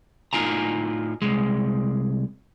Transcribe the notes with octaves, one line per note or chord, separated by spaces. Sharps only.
A2 D#4 F4 G#5 A#5
C2 G#3